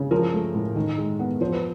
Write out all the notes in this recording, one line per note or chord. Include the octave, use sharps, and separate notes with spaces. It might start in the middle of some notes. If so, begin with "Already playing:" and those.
Already playing: C#3
F3 A#4
A3
A2
D#3
G#3
B3
F3 C5
B4